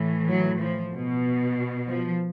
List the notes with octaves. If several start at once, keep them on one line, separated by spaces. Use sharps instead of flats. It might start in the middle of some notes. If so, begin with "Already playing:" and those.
Already playing: A2 E3
F#3
F3
B2
F3